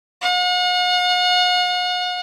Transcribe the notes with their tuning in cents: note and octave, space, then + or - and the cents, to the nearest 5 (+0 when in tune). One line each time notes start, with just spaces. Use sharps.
F#5 -45